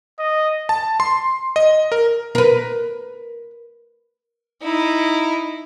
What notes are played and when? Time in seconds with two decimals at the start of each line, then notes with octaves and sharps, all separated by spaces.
0.19 D#5
0.69 A5
1.00 C6
1.56 D#5
1.92 A#4
2.35 A#4 B4
4.62 D#4 E4